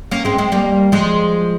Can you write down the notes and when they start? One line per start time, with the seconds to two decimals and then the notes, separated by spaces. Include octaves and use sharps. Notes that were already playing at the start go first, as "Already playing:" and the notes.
0.11 A#3 C#4
0.25 G#3 C4
0.38 G#3 C4
0.52 G3 A#3
0.92 F3 G#3